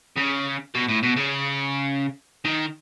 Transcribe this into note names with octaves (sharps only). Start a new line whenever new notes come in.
C#3
B2
A2
B2
C#3
D#3